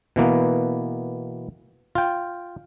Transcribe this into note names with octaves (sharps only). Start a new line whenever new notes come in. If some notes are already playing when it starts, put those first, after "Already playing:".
B2 E3 A#3 B3
F4 G5